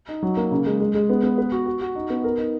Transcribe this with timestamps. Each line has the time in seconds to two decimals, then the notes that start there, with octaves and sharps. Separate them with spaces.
0.08 D#4
0.23 F#3
0.37 A#3
0.51 C#3
0.66 G#3
0.80 G#3
0.94 G#3
1.10 B3
1.23 B3
1.38 B4
1.52 F#4
1.66 F#4
1.81 F#4
1.95 D#4
2.10 B3
2.24 A#4
2.38 D#4